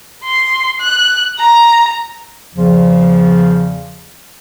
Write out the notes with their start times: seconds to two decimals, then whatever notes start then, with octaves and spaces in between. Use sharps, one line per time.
0.24 C6
0.80 F#6
1.39 A#5
2.55 E2 C#3 F3